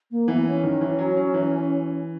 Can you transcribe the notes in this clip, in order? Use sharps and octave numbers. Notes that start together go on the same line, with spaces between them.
A#3
E3 B3
C#4
D#3
E3
F#3
F#3
E3